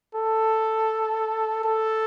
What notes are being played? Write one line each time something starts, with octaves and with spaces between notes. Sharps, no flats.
A4
A4